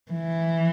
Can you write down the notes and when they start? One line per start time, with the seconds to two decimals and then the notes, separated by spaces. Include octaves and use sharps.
0.11 E3